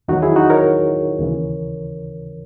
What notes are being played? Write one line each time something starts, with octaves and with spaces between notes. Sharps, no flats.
E2 D#3 F#3 D#4 F#4
E4 G#4
D#4 F#4
A#4 C#5
D#2 C#3 E3